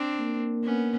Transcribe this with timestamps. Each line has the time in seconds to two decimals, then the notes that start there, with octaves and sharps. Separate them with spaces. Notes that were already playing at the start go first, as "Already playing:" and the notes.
Already playing: C4 D4
0.19 A#3
0.64 B3 C#4